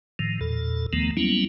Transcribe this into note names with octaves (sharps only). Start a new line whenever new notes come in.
A2 D#3 F3
E2 A#2 A4
D#2 D#3 F3 A3 B3
F#3 G3 A#3 B3 C#4 E4